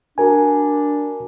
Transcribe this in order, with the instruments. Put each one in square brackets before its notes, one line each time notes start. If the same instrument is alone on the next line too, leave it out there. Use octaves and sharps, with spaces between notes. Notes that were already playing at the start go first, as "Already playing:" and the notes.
[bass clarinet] D4 [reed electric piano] F#4 A#4 G#5